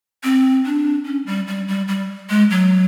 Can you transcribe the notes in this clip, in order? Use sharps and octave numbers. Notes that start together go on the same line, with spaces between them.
C4
D4
C#4
G3
G3
G3
G3
G#3
F#3